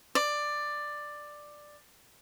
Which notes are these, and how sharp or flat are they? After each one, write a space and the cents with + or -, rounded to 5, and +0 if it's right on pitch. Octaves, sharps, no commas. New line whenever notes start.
D5 +10